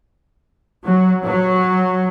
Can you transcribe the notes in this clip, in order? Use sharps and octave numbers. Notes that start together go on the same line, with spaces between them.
F#3
F#3